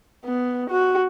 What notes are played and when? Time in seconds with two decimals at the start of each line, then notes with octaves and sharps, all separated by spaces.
0.25 B3
0.70 F#4